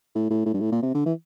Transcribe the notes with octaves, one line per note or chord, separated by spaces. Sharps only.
A2
A2
A2
G2
A2
A#2
C3
D3
E3